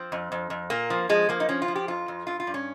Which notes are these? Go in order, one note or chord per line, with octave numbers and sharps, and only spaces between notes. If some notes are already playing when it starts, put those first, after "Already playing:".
Already playing: F3 C4
F2
F2
F2
A#2 A#3
F3
F3 G#3
F3 A#3
D#4
F3 C#4
F4
F3
G4
F2 F4
F2
G2 F4
F4
G2
C#4